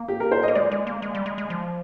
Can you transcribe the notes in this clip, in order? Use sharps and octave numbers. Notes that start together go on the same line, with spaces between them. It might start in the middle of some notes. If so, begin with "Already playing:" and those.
Already playing: A#3
G4
A#4
C5
A#3 D#5
G#3 D5
G#3
A#3
G#3
G3
G#3
G#3
F3